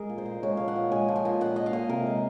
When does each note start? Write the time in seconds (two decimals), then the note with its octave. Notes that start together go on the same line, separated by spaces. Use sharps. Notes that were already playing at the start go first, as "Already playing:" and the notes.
Already playing: G#3 G#4 A#4
0.09 A#2
0.18 C5
0.26 A#2
0.43 G#3 C#5
0.57 F3 F5
0.68 F#5
0.76 A#2
0.92 G#3 G#5
1.08 F3
1.16 G#5
1.25 A#2
1.41 A#2 F#5
1.56 A#2 D#5
1.66 F5
1.73 A#2
1.89 C3 A#4
2.07 G#3